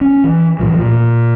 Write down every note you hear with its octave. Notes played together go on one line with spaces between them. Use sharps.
C#4
E3
C#2 A2 E3 F3
A#2